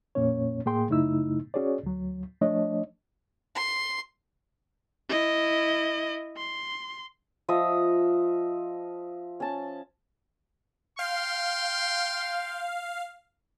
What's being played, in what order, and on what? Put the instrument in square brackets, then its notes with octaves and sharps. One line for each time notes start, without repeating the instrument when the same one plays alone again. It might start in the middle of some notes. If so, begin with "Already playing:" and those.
[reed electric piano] F2 A#2 A#3 C#4 C#5
A2 A#3 G#4 G5 C6
F#2 C#3 A3 D#4 E4 E6
C#4 F#4 G#4 C#5 D5
D2 F#3
F3 A3 D4 C#5 D#5
[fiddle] C6
[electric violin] E4 D#5
C6
[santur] F3 D#5 E5 D#6
C#4 A5
[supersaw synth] F5 [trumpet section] G5 C6